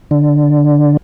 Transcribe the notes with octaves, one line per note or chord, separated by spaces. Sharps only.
D3